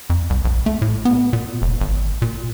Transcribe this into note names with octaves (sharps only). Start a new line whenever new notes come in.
F2
C2
A#1
A3
A2
B3
A#2
F1
G#1
A#2